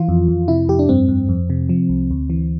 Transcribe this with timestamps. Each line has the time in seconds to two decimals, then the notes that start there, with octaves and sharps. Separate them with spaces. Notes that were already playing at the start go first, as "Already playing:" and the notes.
Already playing: E3 F4
0.09 F2
0.28 F2
0.48 C3 E4
0.68 F2 G4
0.79 D4
0.89 G2 C4
1.09 G2
1.29 F2
1.50 C3
1.69 F3
1.89 C2
2.11 D2
2.30 E3